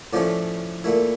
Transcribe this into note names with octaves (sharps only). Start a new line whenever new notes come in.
A2 F3 A3 C#4 D5
A#2 A3 E4